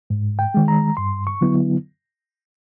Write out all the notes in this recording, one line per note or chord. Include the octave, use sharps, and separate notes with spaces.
G#2
G5
D#3 G#3
A#5
G2 C6
C#6
D3 F#3 B3 E4